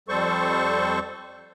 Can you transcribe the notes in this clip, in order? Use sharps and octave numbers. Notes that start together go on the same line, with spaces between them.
F2 G3 A4 C5 C#6